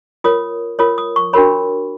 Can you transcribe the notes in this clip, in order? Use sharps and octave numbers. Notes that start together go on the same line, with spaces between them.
F4 A#4 C#5 D#6
F4 A#4 C#5 D#6
D#6
C#6
D4 F#4 A#4 C#5 B5